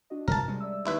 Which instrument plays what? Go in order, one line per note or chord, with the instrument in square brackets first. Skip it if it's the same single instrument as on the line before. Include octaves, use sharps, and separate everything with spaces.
[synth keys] D4 F#4 D#5
[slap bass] G2 [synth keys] C3 [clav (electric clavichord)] A#4 A5
[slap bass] G3 G#3 C#4
[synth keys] D5 E5 E6
[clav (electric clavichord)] D#2 E4 B4